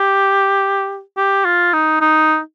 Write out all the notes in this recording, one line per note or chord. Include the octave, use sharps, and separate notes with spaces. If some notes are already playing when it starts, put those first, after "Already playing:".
Already playing: G4
G4
F4
D#4
D#4